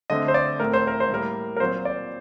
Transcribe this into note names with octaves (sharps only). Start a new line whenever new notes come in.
D3 A3 C4 D#5
C5
D5
A2 A3 C4 A#4
C5
A#4
C5
A2 G3 A#3 A#4
A#4
A#2 F#3 C4 C5
D5